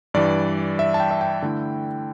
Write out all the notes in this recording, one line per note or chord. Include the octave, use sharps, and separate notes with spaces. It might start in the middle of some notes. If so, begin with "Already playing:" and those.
G2 E3 G3 D5
E5
A5
G5
E5
G5
D3 A3 E4